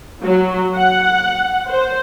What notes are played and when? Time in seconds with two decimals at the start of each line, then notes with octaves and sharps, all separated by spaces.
0.22 F#3
0.75 F#5
1.68 C5